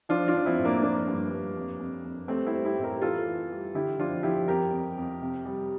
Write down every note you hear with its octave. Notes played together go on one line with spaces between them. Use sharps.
F3 D4 F4
D4 F4
F3
C4 E4
A2
A#3 D4
F3 A#3 D4
G2
G2
F2
F2
F2
G3 A3 C4
C4 E4
G3
E4 G4
A2
G4 A#4
E3 F4 A4
E3
G3
D3 E4 G4
F3 D4 F4
F3 E4 G4
F2 G4 A#4
F2
F2
C3
G3